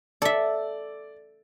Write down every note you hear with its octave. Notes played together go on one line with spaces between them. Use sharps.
A4 D5 E5